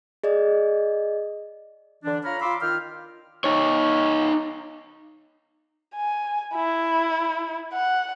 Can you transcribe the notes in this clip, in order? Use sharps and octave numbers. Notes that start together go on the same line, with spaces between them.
G#4 D5 D#5
D3 E3 D4
F4 C#5 A#5 B5 F6
F4 B5 C6 D6 E6
D#3 F4 G5 F6
D#4 C#5
G#5
E4
F#5